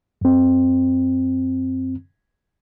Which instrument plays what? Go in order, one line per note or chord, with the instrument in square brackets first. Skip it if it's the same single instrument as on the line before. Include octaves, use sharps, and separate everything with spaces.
[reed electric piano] F#2 C4